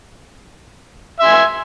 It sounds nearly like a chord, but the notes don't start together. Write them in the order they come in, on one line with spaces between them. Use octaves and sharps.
E5 C6 G#5